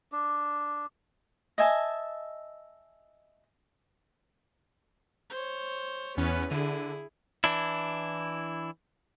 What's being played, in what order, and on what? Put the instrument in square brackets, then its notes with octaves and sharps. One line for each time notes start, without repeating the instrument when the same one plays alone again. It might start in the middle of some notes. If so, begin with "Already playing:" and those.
[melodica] D4
[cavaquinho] D#5 E5 G#5 A5
[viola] C5 C#5
[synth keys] E2 C#4 [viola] B3 B4
[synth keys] D3 D#7 [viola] E4 G#4
[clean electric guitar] E3 D4 E4